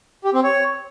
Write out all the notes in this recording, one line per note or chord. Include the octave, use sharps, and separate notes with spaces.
G4
C4
C#5